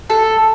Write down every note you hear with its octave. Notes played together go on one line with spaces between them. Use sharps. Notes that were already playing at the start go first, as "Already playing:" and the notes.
A4